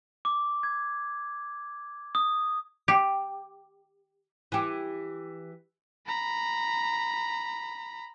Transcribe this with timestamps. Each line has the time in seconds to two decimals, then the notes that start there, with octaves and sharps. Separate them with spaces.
0.25 D6
0.63 G#6
2.15 D#6
2.88 G4
4.52 E3 G4
6.05 A#5 B5